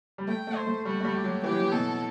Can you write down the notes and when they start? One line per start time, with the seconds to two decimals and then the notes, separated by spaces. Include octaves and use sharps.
0.18 G3
0.28 A3 G5
0.47 A3
0.56 C5
0.67 A3
0.85 G3 F#4
1.00 A3
1.05 G3
1.15 G4
1.24 F#3
1.44 E3 G4
1.51 F#3
1.60 E3
1.72 B2 A4